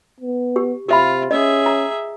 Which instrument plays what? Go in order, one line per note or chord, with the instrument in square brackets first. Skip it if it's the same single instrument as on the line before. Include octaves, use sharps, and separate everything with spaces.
[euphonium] B3
[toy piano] G4
[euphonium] C3 [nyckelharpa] F4 [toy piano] G4 E5 B5
[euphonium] C#4 [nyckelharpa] G#4 E5 [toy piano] D#5
[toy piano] A#5